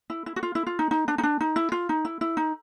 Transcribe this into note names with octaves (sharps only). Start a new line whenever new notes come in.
E4
E4
F#4
F4
E4
F4
D#4
D#4
D4
D#4
D4
D#4
E4
F4
D#4
E4
E4
D#4